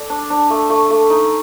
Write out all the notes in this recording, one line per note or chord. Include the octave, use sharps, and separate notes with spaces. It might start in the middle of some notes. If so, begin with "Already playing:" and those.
Already playing: A4 D5
D4
D4
A3
A3
A3
D#4